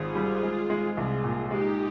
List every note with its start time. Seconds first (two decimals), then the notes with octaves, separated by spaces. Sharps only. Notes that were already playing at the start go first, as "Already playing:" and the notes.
Already playing: G#1 F4 G#4
0.15 G3
0.43 G#3
0.70 G#3
0.96 C2 F4 G#4
1.23 A#2
1.51 G#3 D#4 G4